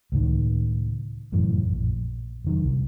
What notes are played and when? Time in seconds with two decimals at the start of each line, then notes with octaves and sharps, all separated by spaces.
0.12 C#2 A2 D#3
1.32 F1 F#2 A2 E3
1.66 A#1
2.44 F1 D#3 F#3
2.64 C2